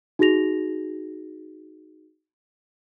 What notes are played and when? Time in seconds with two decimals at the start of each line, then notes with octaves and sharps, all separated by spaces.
0.19 D#4 F#4 G#4 A#6 F7